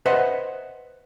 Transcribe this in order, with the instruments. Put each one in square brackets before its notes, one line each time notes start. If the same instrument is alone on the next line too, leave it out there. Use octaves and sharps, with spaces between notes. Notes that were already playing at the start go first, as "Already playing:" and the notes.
[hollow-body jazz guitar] B4 C5 D#5 E5 F#5